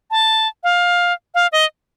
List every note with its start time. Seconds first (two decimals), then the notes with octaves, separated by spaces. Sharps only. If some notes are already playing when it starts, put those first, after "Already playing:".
0.11 A5
0.64 F5
1.35 F5
1.52 D#5